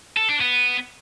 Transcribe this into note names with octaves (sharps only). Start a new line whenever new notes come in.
A4
D4
B3